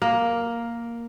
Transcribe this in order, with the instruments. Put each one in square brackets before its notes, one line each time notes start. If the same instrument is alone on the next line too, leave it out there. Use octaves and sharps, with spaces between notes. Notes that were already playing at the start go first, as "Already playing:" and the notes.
[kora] A#3